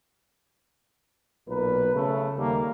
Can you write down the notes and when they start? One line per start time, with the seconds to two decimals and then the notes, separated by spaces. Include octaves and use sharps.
1.48 B1 A#2 A#4 B4
1.95 C#3 A3
2.38 D#2 G3 A3 A#3